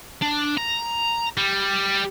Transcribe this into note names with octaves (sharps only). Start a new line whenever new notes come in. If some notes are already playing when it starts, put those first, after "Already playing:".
D4
A#5
G3